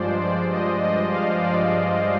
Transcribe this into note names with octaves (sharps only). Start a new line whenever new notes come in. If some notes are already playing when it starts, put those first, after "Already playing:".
Already playing: G2 F3 G#3 C5 D5
D5
D#5
D#5
F5
D5